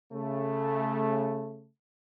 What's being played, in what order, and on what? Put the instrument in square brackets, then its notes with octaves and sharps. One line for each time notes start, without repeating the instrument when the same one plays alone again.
[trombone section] C#3 A3